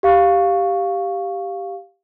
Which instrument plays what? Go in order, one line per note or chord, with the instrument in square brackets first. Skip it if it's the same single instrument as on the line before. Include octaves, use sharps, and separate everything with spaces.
[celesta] G4 F5 C#6